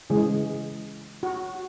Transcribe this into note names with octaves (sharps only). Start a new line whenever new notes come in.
C#3 E3 G#3 G#4
F#4